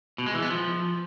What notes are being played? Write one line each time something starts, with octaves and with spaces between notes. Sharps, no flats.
B2
G#3
E3
B3
F3